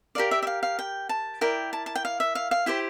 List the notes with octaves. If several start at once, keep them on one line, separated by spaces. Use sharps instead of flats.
G4 A#4 D5 F5
E5
E5
F5
F5
G5
A5
E4 A#4 D5 G5
A5
A5
G5
F5
E5
F5
F5
E4 G4 C5 G5